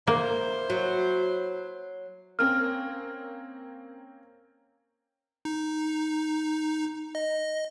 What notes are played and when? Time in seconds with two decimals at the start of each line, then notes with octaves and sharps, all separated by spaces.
0.07 A#3 E4 C5
0.70 F#3
2.39 A#3 C4 C#4 F6
5.45 D#4
7.15 D#5